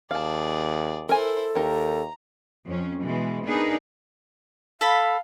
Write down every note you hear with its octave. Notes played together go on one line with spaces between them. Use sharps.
D#2 G#4 D5 F5 A5
E4 A4 A#4 C5 G#5
D#2 D#4 G4 A#4 A#5
F2 C#4
B2 E3 G#3
B3 D4 D#4 G#4 A#4 B4
A4 F5 B5